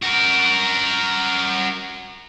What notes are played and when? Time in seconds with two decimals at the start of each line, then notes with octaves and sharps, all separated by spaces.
0.03 F#4 A#4